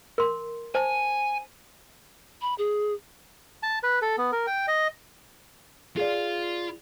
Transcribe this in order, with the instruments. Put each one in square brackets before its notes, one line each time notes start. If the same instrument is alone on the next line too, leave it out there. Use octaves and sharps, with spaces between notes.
[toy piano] A#4 C6
[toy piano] C5 A5 [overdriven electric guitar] G#5
[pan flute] B5
G#4
[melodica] A5
B4
A4
B3
A#4
G5
D#5
[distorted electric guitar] F4 F5 [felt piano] G#4 D5